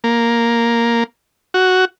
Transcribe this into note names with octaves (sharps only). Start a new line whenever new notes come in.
A#3
F#4